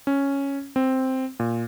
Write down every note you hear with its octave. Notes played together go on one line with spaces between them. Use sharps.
C#4
C4
A#2